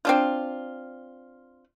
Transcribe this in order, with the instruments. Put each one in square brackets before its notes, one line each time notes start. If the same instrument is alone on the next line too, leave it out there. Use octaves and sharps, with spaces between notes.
[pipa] C4 D4 F4